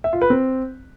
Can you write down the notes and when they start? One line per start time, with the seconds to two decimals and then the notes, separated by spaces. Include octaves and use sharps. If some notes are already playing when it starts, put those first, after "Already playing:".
0.04 E5
0.13 F4
0.21 B4
0.30 C4